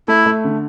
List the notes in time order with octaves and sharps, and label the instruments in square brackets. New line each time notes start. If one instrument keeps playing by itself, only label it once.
[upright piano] A3 [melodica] E4
[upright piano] A3
D3